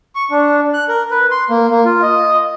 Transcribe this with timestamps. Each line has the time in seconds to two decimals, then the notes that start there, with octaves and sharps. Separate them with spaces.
0.15 C#6
0.31 D4
0.73 F#6
0.89 A#4
1.11 B4
1.31 C6
1.50 A#3
1.70 A#3
1.84 F4
2.02 D#5